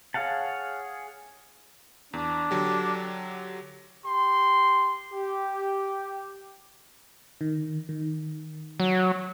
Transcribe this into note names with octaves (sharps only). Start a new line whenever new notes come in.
G#4 C#5 F5 F#5 A5
E2 D4
D3 F#3 G4
G4 C6
G4
D#3
D#3
F#3